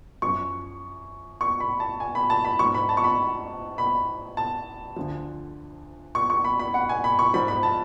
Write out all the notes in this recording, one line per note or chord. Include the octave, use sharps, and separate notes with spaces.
F#2 F3 C#6
C#6
B5
A5
G#5
B5
A5
B5
G#2 F3 C#6
B5
A5
C#6
B5
B5
A5
D2 D3 F3
C#6
C#6
B5
B5
F#5
G#5
B5
C#6
G#2 F3 B5
B5
A5